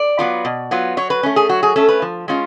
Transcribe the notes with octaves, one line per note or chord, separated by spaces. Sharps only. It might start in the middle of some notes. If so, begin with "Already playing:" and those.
Already playing: D5
F#3 B3 F4
B2
F#3 B3 F4
F#3 C#5
B4
A3 C#4
G#4
F#3 F#4
G#4
A3 C#4 A4
B4
F3
G#3 C#4 F4